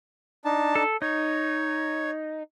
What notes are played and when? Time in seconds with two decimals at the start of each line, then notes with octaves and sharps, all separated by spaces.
0.45 D4 D#4 A5
0.75 A4
1.02 D#4 C#5